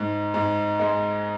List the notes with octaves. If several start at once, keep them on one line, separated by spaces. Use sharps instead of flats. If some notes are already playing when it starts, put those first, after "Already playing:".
Already playing: G#2
G#2
G#3